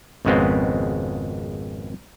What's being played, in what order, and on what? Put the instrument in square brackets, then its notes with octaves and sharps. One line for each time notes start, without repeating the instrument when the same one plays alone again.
[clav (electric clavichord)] G#1 F2 C#3 G#3 B3 C4